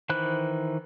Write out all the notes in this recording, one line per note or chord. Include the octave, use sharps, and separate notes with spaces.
D#3 E3 C5 B5 F#6